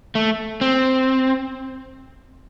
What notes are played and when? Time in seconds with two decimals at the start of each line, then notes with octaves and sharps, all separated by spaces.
0.15 A3
0.61 C4